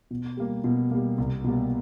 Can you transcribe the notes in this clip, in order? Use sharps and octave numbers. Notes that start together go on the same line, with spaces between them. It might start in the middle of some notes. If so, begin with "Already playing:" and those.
B2
G3 A#3
B2
G3 A#3
C2
B2 G3 A#3